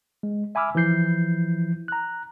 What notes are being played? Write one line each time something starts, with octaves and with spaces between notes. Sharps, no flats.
G#3
E5 G#5 B5 D6 E6 F6
E3 F3 E4 G6 C7
A#5 F#6